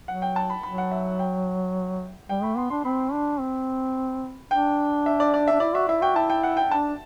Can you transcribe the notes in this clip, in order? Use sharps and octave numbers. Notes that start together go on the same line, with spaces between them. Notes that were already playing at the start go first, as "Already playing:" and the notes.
F#3 F#5
G5
A5
B5
F#3 B5
F#5
E5
G5
G3 G5
A3 B5
B3 C6
D4 C6
C4 B5
D4
C4
D4 G5
E5
D5
D5
D4 E5
E4 D5
F#4 E5
E4 E5
F#4 G5
E4 A5
G5
F#5
G5
D4 A5